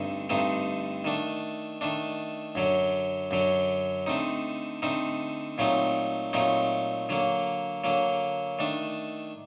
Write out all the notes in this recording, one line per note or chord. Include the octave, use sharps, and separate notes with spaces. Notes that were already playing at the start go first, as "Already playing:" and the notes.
Already playing: G2 D3 A3 C4 D#4
G2 D3 A3 C4 D#4
D#3 A3 D4
D#3 A3 D4
F#2 D3 F#3
F#2 D3 F#3
D3 A3 C4 D#4
D3 A3 C4 D#4
A#2 F#3 A3 C4 D#4
A#2 F#3 A3 C4 D#4
D3 F#3 A#3
D3 F#3 A#3
D#3 A3 D4